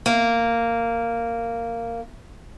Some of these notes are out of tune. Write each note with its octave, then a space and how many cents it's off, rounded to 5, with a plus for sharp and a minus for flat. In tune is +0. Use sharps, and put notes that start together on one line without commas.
A#3 -10